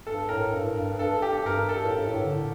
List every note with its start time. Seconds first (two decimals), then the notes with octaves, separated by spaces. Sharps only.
0.07 G2 A4
0.29 A2 A#4
0.53 G2
0.76 G2
0.99 G2 A4
1.22 G4
1.46 G2 A#4
1.69 A4
1.85 A2
1.93 G2
2.09 A2
2.24 D3